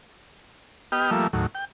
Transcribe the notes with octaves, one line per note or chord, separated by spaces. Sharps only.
B3 G4 D#5 G5 F6
F3 G3 A3 A#3 E5
D#2 A2 F#3
G5